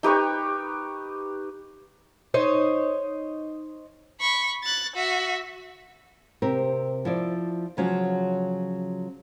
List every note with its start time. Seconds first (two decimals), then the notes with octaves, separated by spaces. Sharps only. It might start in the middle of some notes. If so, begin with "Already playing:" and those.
0.03 D#4 G4 B4 C#6
2.34 D#4 C5 C#5
4.20 B5 C#6
4.63 F#6 A6
4.95 F#4 E5
6.42 C3 C4 G4 A#4
7.05 F3 E4 D5
7.77 C#3 F3 F#3 C#4 F4 F#4